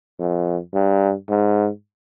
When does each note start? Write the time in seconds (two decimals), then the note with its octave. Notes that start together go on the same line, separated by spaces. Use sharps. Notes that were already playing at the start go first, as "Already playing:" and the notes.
0.19 F2
0.74 G2
1.29 G#2